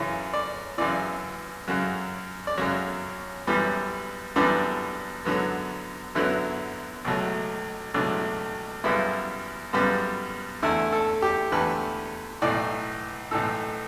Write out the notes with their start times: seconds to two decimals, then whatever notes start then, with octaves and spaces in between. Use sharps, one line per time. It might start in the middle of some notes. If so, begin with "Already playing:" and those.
Already playing: F#2 C#3 E3 C#5
0.34 D5
0.78 F#2 C#3 E3 D5
1.68 F#2 C#3 F#3
2.47 D5
2.58 F#2 C#3 F#3 C#5
3.47 F#2 E3 G3 B3
4.36 F#2 E3 G3 B3 D4
5.25 F#2 D3 F#3 B3
6.15 F#2 D3 F#3 B3 E4
7.05 C#2 B2 F#3 A3
7.94 C#2 B2 F#3 A3 D4
8.84 F#2 C#3 G3 B3 E4
9.73 F#2 C#3 G3 B3
10.63 E2 D3 A3 E4
10.92 A4
11.22 G4
11.52 E2 D3 A3 B4
12.42 B1 A2 E3 D5
13.31 B1 A2 E3 A4